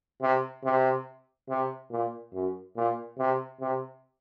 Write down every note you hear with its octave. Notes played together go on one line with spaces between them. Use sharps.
C3
C3
C3
A#2
F#2
A#2
C3
C3